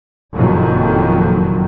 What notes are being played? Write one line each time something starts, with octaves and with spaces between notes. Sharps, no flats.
F#1 F2 A#2 D#3 F#3